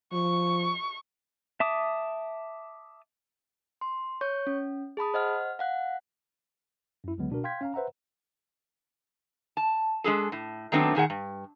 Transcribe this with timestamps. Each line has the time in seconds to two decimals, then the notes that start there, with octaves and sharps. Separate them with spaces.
0.13 F3 C#6
1.60 E5 A5 D6 D#6
3.81 C6
4.21 C#5 C#6 G6
4.47 C#4
4.97 G#4 A5 B5 D#6
5.14 C5 D#5 F#5 F6
5.59 F5 F#5 F#6
7.04 F#2 E4
7.18 C#2 D3 F#3 G#3 B3
7.30 B2 D4 F#4 A#4
7.44 F5 G5 C6 G6 G#6 B6
7.61 C#4 F5 A#5
7.74 B4 C5 E5 F#5 A#5
9.57 A5
10.04 G#3 D4 G#4 A4
10.32 A2
10.72 D#3 F#3 A3 B3 C4 D4
10.95 A#2 D#3 G#4 F#5
11.10 G2